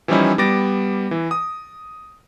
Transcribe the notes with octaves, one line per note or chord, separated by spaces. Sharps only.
E3 F3 G3 C#4 D#4 E4
G3 B3 D6 A6 A#6 D7
E3
D#6